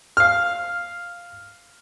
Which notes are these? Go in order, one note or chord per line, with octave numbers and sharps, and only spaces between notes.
F5 F6